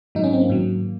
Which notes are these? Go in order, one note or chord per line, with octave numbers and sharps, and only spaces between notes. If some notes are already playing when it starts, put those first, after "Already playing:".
G#2 D#3 F#3 D#4
C#4
C4
A#3
G#2 D#3 F#3